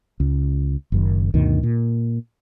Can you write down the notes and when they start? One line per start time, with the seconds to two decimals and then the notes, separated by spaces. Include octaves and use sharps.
0.20 C#2
0.92 F#1 F#2 D#3
1.34 D2 G2 B2 D#3
1.63 A#2